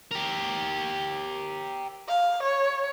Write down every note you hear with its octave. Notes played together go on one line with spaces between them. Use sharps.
G4 A#4
F5
C#5